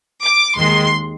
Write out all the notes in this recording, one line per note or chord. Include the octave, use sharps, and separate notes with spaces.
D6
D#2 D#3 G#3 C6